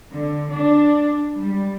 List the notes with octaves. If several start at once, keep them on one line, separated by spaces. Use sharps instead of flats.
D3
D4
G3